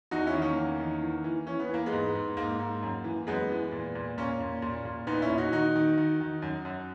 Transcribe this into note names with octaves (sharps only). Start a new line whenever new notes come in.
E2 D#4 F#4
C#4 E4
D#3
A#3 C#4
E2
D#3
E3
E3
E3 C#4
B3
E3 A#3
G#3 B3
G#2
G#2
G#2 A#3
G#2
F#2
E3
F#2 G#3 B3
E3
A#2
A#2
A#2 A#3 C#4
A#2
A#2
A#2
A#2 B3 D#4
C#4 E4
A#2
D#4 F#4
D#3 D#4 F#4
D#3
D#3
D#3
F#2
F#2